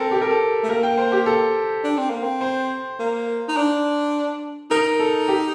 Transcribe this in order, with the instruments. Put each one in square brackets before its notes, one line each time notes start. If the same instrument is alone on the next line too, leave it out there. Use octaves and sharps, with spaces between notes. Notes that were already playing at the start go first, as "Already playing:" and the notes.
Already playing: [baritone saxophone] C4 [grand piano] A4 A#4
[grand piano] G4
A#4
A4
[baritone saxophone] A3
[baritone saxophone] A#3 [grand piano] A#4
[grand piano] G5
C5
G4
A4
[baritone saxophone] D4
C4
A#3
C4
[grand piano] C5
[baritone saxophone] A#3
D#4
D4
[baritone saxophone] D#4 [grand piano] A#4
[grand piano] A4
G4